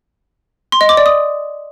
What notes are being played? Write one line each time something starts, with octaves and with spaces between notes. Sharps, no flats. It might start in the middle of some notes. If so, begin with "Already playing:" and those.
C6
D#5
D6
D5
D#6